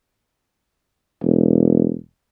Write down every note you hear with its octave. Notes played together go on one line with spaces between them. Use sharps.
E1